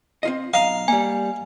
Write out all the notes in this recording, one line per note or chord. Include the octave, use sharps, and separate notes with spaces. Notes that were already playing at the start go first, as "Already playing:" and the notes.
C4 F4 D#5
B1 D#5 F5 A#5
G3 A#3 G#5